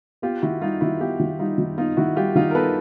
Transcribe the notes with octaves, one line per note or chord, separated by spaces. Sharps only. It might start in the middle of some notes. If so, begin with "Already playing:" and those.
B3 F4 G4
D#3 E4 F#4
G3 D#4 F4
D#3 E4 F#4
B3 F4 G4
D#3
G3 D#4 F4
D#3
B3 D#4 F4
D#3 E4 F#4
G3 F4 G4
D#3 D#4 F4
A#4
B3 A4 B4